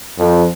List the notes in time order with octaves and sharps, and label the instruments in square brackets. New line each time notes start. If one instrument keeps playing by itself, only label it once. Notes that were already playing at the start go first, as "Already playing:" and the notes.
[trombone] F2